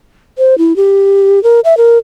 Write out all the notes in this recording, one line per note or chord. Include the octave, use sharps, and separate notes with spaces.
C5
E4
G4
A#4
E5
A#4